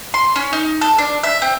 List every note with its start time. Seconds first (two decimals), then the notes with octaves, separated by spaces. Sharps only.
0.14 C6
0.36 C#4
0.53 D#4
0.81 A4
0.98 D4
1.23 E5
1.42 C4